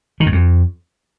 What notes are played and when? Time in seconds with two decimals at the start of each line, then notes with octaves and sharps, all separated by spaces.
0.20 D#3
0.26 F#2
0.32 F2